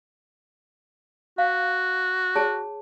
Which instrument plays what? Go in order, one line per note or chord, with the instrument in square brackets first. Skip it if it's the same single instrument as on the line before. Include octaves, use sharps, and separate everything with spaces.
[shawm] F#4 [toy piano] F5
[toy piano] G#4 C#5 A5